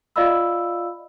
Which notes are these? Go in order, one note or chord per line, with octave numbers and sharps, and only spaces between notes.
F4 D5 D#5 F5 B5 E6